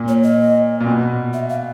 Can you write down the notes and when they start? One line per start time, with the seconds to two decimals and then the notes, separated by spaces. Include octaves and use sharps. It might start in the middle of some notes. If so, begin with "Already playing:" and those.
Already playing: A#2
0.08 C#5
0.23 D#5
0.80 A#2
0.86 B2
1.33 E5
1.50 F5